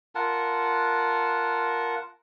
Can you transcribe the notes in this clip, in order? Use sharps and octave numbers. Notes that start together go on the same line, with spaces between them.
F4 A#4 F#5 A5